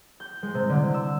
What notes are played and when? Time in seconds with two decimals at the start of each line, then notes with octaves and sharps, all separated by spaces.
0.20 G6
0.43 G#3
0.55 C3
0.69 D3
0.94 E6